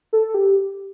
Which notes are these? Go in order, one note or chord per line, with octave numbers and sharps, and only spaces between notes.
A4
G4